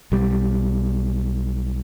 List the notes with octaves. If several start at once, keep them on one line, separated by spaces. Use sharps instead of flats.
B1 G3